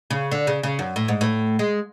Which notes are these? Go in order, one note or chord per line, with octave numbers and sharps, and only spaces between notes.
C#3
D3
C#3
C#3
F#2
A2
G#2
A2
G#3